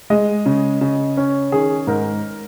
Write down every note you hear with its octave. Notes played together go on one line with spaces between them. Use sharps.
G#3 D#5
C#3
C#3
C#4
D#3 G#4
G#2 A#4